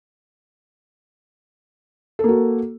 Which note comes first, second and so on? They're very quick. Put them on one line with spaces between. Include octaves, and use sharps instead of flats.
A4 A#3 F#4